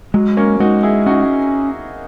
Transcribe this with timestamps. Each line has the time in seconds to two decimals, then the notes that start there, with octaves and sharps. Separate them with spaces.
0.14 F#3 G#3
0.37 A#3 C#4
0.60 G#3 D#4 F#4
0.83 E4 G#4
1.06 C#4 D#4 F#4